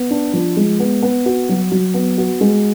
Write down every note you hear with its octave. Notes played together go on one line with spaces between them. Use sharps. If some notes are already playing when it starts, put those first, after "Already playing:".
Already playing: B3
D4
F3
G#3
B3
B3
F#4
F#3
F#3
B3
F#4
G#3